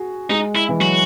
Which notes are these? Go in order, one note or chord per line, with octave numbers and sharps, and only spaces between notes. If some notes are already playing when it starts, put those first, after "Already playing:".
Already playing: F#4 G#4
G#3 D#4
E4
E3
F#3 F#4